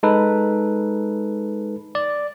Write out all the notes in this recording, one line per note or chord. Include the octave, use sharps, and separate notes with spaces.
G#3 D#4 A4 B4
D5